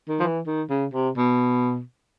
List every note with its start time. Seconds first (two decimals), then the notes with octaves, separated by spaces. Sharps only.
0.08 D#3
0.20 F3
0.23 E3
0.46 D#3
0.69 C#3
0.93 C3
1.17 B2